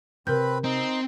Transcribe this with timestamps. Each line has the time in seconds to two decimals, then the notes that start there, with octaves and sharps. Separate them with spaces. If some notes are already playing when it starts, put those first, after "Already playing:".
0.27 C3 C4 A#4 B4 B5 G6
0.64 C4 D#4